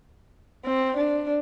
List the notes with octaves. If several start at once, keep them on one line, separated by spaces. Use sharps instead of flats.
C4
D4